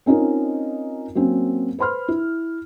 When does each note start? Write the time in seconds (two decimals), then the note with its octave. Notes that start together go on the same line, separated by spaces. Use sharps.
0.06 C4 C#4 D#4 F4 A#4
1.15 F#3 A#3 C4 C#4
1.79 B4 C5 B5 C6 F6
2.08 E4